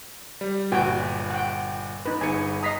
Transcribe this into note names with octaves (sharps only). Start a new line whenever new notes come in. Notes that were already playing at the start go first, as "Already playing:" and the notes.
G3
G1 A#2 F#4 B4 G5 G#5
F#5 G5
D#4 B4
G1 G#4 G#5 C#7
D#5 A#5 D#6 B6 C7